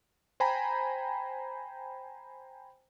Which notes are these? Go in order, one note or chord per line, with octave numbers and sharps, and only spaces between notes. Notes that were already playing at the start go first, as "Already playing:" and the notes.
C5 G5 G#5 A#5 B5